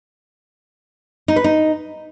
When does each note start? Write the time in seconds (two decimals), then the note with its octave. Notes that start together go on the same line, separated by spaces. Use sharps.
1.28 D#4
1.36 B4
1.44 D#4